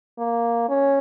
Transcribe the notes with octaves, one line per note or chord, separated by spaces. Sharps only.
A#3
C#4